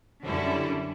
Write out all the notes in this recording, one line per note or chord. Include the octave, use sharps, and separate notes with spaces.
F#2 D3 G3 C#4 E4